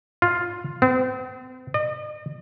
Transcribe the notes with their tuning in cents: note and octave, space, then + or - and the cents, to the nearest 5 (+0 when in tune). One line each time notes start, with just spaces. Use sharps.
F4 +5
C4 -40
D#5 -45